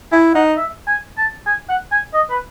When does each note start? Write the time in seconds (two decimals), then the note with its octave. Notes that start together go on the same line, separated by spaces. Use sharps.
0.12 E4 G#5
0.34 D#4 F#5
0.57 E5
0.87 G#5
1.17 A5
1.46 G#5
1.69 F#5
1.92 G#5
2.14 D#5
2.30 B4